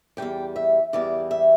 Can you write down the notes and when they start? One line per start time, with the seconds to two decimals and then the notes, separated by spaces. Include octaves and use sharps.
0.17 E3 G3 G5
0.22 E2
0.56 E5
0.93 E2 E3 G3 D5
1.31 E5